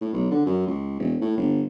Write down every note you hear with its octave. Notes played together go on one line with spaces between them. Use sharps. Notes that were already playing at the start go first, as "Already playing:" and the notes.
A2
B1
D3
F#2
C#2
E1
A2
G1